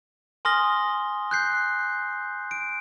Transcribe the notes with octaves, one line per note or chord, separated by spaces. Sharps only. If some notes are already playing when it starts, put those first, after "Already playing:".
G#5 C6 D#6 F6 A#6 G7
F#6 G6 C7
D7